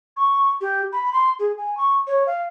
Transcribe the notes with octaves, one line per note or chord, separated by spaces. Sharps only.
C#6
G4
B5
C6
G#4
G#5
C#6
C#5
F5